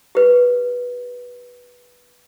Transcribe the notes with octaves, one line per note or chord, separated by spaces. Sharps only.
G4 B4